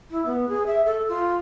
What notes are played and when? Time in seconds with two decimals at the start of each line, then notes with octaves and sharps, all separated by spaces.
0.11 E4
0.26 B3
0.49 G#4
0.67 E5
0.86 A4
1.09 F4